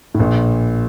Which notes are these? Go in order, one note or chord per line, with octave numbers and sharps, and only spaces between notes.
A2
A#1 A#2